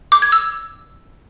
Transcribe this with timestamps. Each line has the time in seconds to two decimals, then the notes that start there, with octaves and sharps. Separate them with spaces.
0.12 D6
0.22 G#6
0.32 E6